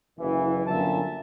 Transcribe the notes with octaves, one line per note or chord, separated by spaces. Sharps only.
F#1 E3
G1 F#2 A#2 E5 A5